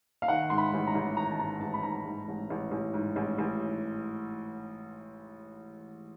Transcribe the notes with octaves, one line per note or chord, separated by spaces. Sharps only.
F5
D#3 F#5
G#2 C6
B5
A1
A#5
A1
D#3 A#5
A5
G#2 A#5
A1 A5
B5
G#2 A#5
G#2
A1
A1
A1
G#2
A1
A1